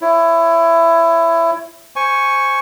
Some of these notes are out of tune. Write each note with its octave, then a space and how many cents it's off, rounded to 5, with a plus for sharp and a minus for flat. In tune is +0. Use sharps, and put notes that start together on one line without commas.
E4 +20 C#5 -5
C5 +0 G#5 +0 C#6 +0